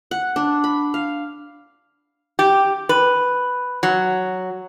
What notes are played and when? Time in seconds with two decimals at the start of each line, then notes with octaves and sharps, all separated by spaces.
0.11 F#5
0.36 D4
0.64 B5
0.94 F5
2.39 G4
2.89 B4
3.83 F#3